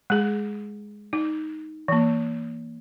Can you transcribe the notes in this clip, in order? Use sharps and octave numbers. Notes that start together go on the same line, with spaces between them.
G#3 G#4
D#4
E3 A#3